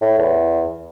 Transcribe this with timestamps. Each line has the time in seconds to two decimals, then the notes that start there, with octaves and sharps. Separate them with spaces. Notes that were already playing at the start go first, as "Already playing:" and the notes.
0.01 A2
0.18 E2